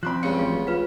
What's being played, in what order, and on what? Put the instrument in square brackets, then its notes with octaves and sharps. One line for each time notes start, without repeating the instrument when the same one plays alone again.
[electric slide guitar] F3 C4 [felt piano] B5 C6 F#6
[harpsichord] C#2 G2 C#3 [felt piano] C#7
[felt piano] A1 [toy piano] F#4
[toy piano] F4 B4 F5